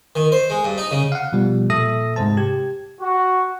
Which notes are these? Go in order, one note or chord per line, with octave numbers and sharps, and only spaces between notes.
D#3
C5
G#3
G2
D#4
C#3
F5 F#5
B2 F3 G3
A#2 A4 E5 D#6 A#6
G#2 C3 G#3 C5 A5
G4 G#6
F#4